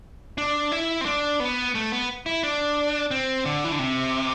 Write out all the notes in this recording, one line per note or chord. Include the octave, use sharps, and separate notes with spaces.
D4
E4
C4
D4
B3
A3
B3
E4
D4
C4
D3
E3
D3
C3